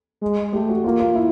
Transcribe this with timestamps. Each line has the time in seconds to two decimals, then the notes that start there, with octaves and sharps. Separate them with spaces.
0.22 G#3
0.53 A3 G4
0.69 F#4
0.84 A#3 F4
1.00 F4
1.15 E4